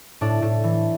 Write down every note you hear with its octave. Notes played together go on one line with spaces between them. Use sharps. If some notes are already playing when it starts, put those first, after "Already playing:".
A2 D4
A2
E3